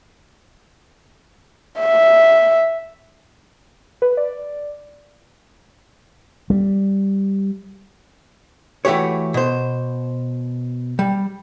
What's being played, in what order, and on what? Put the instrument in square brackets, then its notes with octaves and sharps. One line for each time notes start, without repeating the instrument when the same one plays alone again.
[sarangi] E5
[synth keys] B4
D5
[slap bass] G3
[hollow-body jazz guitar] E3 A3 F#4 G4 C#5
B2 C5
G3